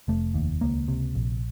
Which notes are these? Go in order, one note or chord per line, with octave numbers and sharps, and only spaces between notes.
F1 A3
D#2
C#2 A#3
C3
A#1